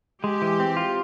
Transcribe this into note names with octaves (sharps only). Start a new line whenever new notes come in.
G#3 G4
E3
C4
F4